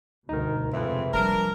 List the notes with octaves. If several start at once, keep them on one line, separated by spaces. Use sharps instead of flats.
D2 G2 B2 D#4 A#4
F2 C3 G#3 B4 E5
F3 G3 D4 A#4